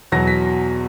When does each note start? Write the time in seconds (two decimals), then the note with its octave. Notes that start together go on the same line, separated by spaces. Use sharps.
0.12 E2 B2 F#3 A#6
0.27 B6